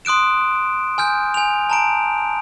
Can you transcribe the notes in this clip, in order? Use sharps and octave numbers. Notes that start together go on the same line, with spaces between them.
C6 D#6 F#6 D7 E7
G#5 F6 G6
G#5 F7
A5 A#5 D7